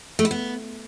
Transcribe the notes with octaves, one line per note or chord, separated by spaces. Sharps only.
A3
E4
B3